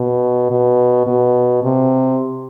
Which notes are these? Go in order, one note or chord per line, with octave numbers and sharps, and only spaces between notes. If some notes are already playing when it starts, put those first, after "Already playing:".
Already playing: B2
B2
B2
C3